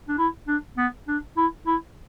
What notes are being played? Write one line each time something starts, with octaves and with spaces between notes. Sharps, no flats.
D4
E4
D4
B3
D4
E4
E4